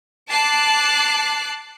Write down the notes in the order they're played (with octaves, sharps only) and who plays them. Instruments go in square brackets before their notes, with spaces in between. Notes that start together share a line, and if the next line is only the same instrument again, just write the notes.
[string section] A5 D6 F#6 C7